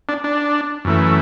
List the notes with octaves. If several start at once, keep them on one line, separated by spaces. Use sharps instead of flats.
D4
D4
F#2 E3 A3